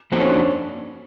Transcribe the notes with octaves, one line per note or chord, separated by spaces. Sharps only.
F3 A#3 C4 D#4 F#4 A4
C#4
D4
C#4